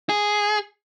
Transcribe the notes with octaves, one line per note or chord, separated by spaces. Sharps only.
G#4